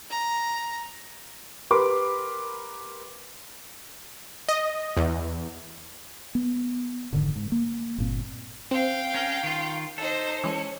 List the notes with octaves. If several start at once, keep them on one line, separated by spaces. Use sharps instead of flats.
A#5
G4 A#4 B4 B5 C6 D6
D#5
E2
B3
F1 G#2 D3 D#3
G#2
A#3
G1 A#2 C4
C4 F5 G5
C#4 A#4
D#3 F4
D#4 A4 C5
E3 G#3 C#4